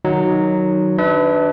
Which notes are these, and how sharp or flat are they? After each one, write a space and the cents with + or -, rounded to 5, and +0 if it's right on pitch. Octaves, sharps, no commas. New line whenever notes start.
D#3 -15 F#3 +0 D#4 +0
D4 +0 B4 +20 E5 -40